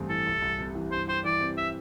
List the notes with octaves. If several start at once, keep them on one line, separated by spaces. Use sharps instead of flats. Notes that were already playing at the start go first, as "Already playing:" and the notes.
Already playing: A1 G2 A3 C4
E3 A4
C2
C2
C3
E3
G2 C5
G4 C5
E3 D5
C4
E5